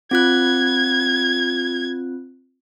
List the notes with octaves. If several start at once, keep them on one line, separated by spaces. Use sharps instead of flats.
C4 F4 F#6 G#6